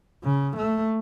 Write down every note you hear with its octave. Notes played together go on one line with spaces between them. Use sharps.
C#3
A3